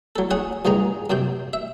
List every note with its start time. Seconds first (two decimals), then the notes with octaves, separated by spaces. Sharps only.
0.16 F#3 A4
0.31 C#4 G#4 C#5 F#5
0.65 C#2 G2 D#3 G#3 A#5
1.10 F#2 C3 C4 G5
1.53 E5